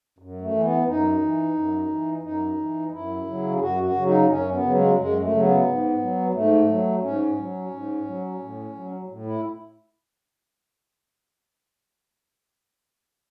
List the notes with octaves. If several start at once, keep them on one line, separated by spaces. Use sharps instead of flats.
F#2
A3
E3
B3
F#2 D#4
E3
F#2
E3
F#2 D#4
E3
F#2 E4
C#3 F#3
G#4
F#2 F#4
F#4
C#3 F#3
D#4
F#2 C#4
B3
C#3 F#3
G#3
F#2 G#3
A3
C#3 F#3
B3
G#2
F#3
G#2 A3
F#3
G#2 C#4
F#3
G#2
F#3
A2
F#3
A2
E4